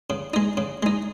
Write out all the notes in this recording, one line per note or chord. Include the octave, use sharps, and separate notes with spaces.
C#3
G#3 D#4
C#3
G#3 D#4